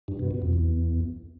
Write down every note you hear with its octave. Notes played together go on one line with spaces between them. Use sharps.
G2
B2
B2
F2
E2